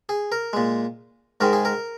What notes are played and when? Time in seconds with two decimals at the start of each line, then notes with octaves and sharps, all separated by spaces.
0.09 G#4
0.32 A#4
0.53 A#2 G#3
1.41 G#2 D#3 G#3 A#4
1.53 G#4
1.65 A#4